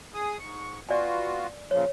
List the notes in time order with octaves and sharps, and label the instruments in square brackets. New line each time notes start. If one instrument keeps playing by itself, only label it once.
[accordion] G#4 G#5 D#6
G#2 C#6
[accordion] B3 F4 F#4 [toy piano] D5 G#5
[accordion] A#2 C#3 F3 [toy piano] C#5